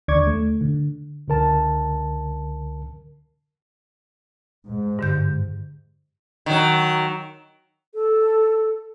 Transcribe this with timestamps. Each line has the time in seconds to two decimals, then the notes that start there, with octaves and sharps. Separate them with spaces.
0.08 D#2 D3 D5 C#6 D6 G#6
0.27 A3
0.61 D3
1.28 C#2 D3 A#4 A5
4.66 G#2
4.99 G2 D3 G6
6.46 D#3 F#3
7.94 A4